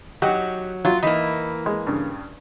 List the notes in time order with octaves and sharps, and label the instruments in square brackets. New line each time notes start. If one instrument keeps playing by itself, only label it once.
[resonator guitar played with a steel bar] F#3 [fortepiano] D#4 F#4 G4
[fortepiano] F#3 [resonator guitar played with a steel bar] F4
[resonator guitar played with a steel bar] E3 A#3 [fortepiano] D#4
[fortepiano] G#3
G2 C#3